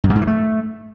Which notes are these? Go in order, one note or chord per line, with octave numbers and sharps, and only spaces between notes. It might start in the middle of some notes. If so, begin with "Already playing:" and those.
G2
F#2
G#2
E3
A3